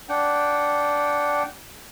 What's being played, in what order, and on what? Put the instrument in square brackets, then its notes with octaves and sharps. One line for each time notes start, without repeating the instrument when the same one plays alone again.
[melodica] D4 F#5 G5